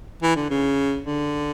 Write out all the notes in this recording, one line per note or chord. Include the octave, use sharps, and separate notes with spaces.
E3
D3
C#3
D3